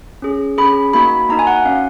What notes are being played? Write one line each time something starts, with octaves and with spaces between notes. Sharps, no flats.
C#4 G#4
C#4 G#4 B5
A#3 D#4 F#4 B5
A#3 D#4 F#4 A#5
G#5
F#5
C#4 F#4 F5